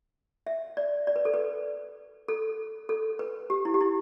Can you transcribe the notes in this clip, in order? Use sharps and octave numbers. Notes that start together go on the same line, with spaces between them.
E5
D5
D5
B4
A4
B4
A4
A4
B4
G4
E4
G4
E4